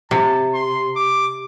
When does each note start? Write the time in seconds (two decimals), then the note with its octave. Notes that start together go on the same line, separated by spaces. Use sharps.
0.11 C3 A5
0.54 C6
0.96 D6